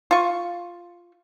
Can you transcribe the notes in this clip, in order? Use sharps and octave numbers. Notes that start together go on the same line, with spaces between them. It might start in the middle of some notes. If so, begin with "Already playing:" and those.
F4 C#6